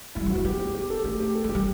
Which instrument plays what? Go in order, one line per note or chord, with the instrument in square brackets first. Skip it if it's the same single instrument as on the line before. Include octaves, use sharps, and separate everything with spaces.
[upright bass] A3 [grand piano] E4
[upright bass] G3
F#3
[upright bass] B3 [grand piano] F#4
[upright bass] B3 [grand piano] G4
[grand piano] G4
G4
A4
[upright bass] A3 [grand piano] G4
[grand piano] G4
A4
[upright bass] A3
[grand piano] G4
[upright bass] G3